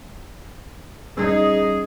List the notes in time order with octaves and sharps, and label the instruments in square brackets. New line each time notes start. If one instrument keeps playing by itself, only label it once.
[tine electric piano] G3 C#4 [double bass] D#4 [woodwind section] G#4